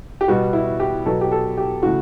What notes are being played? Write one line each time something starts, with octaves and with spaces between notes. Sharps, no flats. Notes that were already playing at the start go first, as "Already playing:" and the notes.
G4
B2 G3 B3 F#4
E4
G4
B2 F#3 B3 A4
G4
A4
G4
C#3 E3 A3 F#4